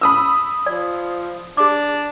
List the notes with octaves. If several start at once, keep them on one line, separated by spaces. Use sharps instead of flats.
B5 D#6 E6
F3 D5
D4 G#4 D6